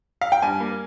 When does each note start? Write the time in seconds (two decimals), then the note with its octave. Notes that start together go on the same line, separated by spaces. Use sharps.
0.21 F5
0.32 G5
0.42 G2 G#5
0.60 A#3